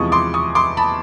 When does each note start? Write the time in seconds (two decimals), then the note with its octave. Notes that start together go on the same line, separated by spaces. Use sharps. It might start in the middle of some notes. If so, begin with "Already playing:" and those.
Already playing: E2 C3 F3 G#3 C#6 D#6
0.12 C6 D6
0.34 C#6 D#6
0.55 C6 D6
0.77 A5 B5